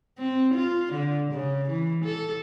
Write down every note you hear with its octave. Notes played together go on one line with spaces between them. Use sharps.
C4
F4
D3
C#3
E3
A4